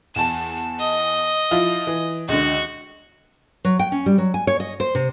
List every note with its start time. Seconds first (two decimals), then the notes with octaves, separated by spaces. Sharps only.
0.16 E2 A5 E7
0.80 D#5
1.51 F3 E4 F4
1.87 E3
2.29 C#2 D3 F#4
3.65 F#3
3.79 G5
3.92 C#4
4.06 G3
4.18 F#3
4.34 G#5
4.47 C#5
4.60 D#5
4.80 C5
4.95 C3